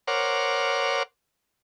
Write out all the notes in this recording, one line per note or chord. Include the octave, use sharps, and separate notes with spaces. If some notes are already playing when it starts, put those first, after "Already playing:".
A#4 C5 C#5 F#5 D6 F6